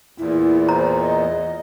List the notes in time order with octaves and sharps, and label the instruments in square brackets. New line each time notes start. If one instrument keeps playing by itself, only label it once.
[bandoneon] E2 A#2 [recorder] E4
[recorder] C5 [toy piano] A#5
[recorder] D#5